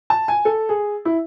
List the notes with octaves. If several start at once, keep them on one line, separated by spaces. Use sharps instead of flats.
A5
G#5
A4
G#4
E4